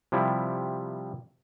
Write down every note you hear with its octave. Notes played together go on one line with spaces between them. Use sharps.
C3 F3 G3 E4